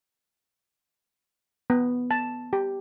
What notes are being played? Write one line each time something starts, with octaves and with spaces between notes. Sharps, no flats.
B3
A5
G4